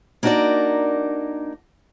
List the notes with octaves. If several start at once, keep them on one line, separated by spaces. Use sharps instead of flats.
A#3 D4 D#4 F#4 A#4 D5